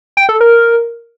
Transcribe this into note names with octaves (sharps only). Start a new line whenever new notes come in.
G5
A4
A#4